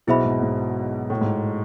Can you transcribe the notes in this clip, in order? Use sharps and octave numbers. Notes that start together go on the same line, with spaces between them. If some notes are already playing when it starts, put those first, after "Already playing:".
B1 B2 E4 G#4 C5 E5 B5
G#2
G#2
A2
G#2